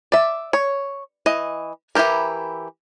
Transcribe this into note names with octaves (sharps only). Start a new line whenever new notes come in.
D5 E5
C#5
E3 D#5
E3 F#3 E4 G4 A#4